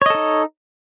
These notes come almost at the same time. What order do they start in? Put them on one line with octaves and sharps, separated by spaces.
C#5 D#5 A4 D#4